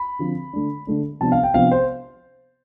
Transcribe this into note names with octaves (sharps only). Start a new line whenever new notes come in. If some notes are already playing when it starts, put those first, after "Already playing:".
Already playing: B5
D3 F3 C4
D3 A3 D4
D3 A3 D4
C3 F3 B3 D4 A5
F5
G5
C3 F3 B3 D4 F5
C5